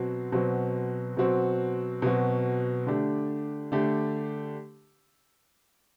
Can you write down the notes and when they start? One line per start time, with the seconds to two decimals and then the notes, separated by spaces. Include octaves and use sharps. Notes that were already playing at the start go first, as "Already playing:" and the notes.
Already playing: B2 F#3 C4 F#4
0.32 B2 F#3 C4 F#4
1.17 B2 F#3 C4 F#4
2.02 B2 F#3 C4 F#4
2.86 D3 A3 D4 G4
3.72 D3 A3 D4 G4